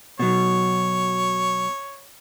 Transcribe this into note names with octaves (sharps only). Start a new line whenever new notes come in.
B2 F#3 C#5